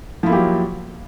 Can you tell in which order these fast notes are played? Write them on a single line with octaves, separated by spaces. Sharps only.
F3 E4 A#3 G4 F#3